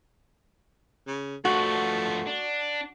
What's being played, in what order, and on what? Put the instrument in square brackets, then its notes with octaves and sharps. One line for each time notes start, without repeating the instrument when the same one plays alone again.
[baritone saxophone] C#3
[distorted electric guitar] G2 F3 [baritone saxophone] A3 [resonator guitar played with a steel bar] F#4
[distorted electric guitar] D4